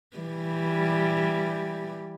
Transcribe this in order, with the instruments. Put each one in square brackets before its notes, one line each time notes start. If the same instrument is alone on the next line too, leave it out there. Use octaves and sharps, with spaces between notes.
[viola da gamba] E3 G3